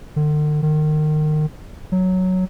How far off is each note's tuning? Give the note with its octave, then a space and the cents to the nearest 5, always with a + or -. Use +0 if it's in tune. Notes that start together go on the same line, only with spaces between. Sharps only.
D3 +40
D#3 -30
F#3 +0